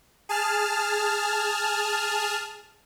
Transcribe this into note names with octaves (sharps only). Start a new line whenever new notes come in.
G#4 A5 F6